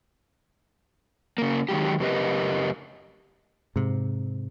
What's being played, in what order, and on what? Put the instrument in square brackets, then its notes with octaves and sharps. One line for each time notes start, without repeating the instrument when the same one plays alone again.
[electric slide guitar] C#3 A#3
D#3 F#3 G#3 G4
F#2 C#3 G4 A#4 B4 D#5
[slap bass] G#2 C3